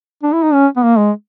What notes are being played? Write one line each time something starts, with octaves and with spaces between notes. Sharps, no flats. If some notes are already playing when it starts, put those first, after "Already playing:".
D4
E4
D#4
C#4
B3
A#3
G#3